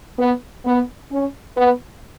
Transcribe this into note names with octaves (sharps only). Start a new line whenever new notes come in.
B3
B3
C#4
B3